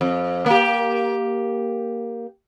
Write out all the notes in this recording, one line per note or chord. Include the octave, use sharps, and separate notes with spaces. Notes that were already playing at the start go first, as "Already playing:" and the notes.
F2
A#3 G4